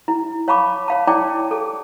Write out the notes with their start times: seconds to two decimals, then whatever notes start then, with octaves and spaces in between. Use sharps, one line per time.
0.08 E4
0.48 C#5 F5 A5 B5 C#6 D6
0.88 C#5 F5 A5
1.07 E4 C#5 D5 G5 A5 D6
1.51 G#4 A4